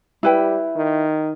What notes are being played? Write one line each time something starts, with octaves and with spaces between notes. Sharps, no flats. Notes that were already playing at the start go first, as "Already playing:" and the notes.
G3 E4 B4 G5
D#3